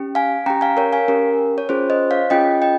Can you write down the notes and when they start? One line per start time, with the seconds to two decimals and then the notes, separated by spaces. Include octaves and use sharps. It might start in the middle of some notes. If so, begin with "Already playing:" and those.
Already playing: C#4 G4
0.15 F5 G#5
0.46 C#4 G4 G5 A#5
0.61 F5 G#5
0.77 A#4 C#5
0.93 F5 G#5
1.08 C#4 G4 A#4
1.58 C#5
1.69 C#4 F4 G#4 C5
1.90 C5 D#5
2.11 C#5 F5
2.30 C#4 F4 G#4 D#5 G5
2.62 D#5 G5